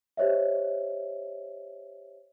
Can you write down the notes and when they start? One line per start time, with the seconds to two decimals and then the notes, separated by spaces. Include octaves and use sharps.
0.17 G4 C5 C#5 D#5 E5